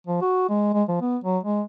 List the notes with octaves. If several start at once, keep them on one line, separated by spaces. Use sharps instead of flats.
F3
F#4
G#3
G#3
F3
B3
F#3
G#3